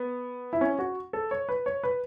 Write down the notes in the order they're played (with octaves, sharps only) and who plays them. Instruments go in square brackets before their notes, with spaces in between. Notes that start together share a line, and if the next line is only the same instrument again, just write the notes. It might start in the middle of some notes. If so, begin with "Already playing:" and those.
Already playing: [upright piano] B3
E4
C#4
F#4
A4
C#5
B4
C#5
B4